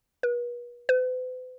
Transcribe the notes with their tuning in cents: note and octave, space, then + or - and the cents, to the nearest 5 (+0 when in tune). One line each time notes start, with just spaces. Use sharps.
B4 -40
B4 +45